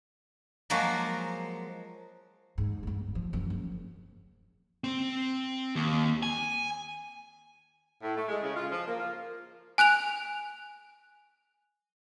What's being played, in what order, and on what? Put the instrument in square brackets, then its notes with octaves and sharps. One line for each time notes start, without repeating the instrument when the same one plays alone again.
[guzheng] F3 F#3 G#3 A#3 F#4
[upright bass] G#2
G1 G2
F3
F#2 F3
F#1
[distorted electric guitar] C4
D#2
G#5
[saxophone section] A2
A3
G#3
C#3
F4
F3
A#3
F4
[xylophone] G#5 F#6 D7 F7